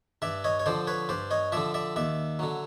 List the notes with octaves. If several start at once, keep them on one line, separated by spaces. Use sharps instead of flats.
G2 D5 E5
C#5 D#5
C#5
D3 F3 C5 D5
B4 C#5
G2 C5 D5
C#5 D#5
D3 F3 D5 E5
D5 E5
D#2 D5 E5
D3 F#3